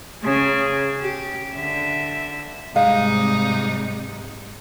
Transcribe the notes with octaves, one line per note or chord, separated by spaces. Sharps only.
C#3 G#4
G4
D3 E5
G#2 C3 G3 G#3 D#4 F5